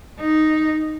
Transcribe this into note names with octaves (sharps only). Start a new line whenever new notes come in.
D#4